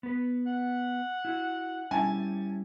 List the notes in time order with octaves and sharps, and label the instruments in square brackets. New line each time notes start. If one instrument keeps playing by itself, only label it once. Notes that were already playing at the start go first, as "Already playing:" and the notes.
[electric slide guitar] B3 B4
[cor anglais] F#5
[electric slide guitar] E4 F#4
[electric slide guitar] G3 C#4 E4 [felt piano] G#5 A5